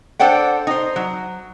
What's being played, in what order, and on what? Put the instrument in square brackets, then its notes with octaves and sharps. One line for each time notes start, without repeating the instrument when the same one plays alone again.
[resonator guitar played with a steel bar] D4 A4 C5 D5 F#5 G5
D#4 C5
F#3